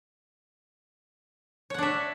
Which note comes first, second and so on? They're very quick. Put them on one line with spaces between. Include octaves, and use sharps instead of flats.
C#5 F#5 D4 E5